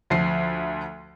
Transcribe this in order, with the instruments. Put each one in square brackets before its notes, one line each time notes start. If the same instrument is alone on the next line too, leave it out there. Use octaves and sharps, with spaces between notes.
[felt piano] D2 F3 C7